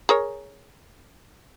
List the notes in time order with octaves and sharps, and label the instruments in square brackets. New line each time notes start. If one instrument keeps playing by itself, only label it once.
[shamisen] G#4 A#4 C#5